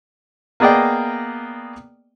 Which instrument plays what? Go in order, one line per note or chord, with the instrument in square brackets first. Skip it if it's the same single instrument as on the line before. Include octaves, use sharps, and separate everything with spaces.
[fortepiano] A#3 B3 G#4 D5 D#5 G5